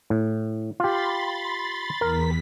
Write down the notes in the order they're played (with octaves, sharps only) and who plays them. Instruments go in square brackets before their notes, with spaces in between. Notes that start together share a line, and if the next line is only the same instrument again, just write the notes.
[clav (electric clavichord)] A2
[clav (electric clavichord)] F4 G4 [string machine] B5 C6 A6
[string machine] E2 B6 [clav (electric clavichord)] A#4